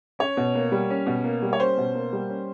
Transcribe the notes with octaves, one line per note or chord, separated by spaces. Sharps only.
C#4 C#5
B2
A#3
G3
C#4
B2
A#3
G3
C#5
C#4 C5
B2
A#3
G3
C#4